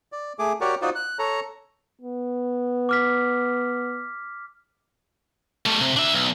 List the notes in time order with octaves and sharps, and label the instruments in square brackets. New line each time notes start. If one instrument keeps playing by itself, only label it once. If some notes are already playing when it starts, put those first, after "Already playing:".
[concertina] D5
A3 G#4 D6
F#4 G4 A#4 C#5 D5
D#4 F4 F#4 C5 D5
F#6
A4 C#5 A#5
[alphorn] B3
[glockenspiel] D6 F6 B6
[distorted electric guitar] G3 A3
C3
D4 E5
B1